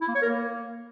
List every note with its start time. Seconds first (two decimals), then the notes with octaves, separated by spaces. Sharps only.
0.01 E4
0.08 A#3
0.15 C#5
0.22 A#4
0.29 A#3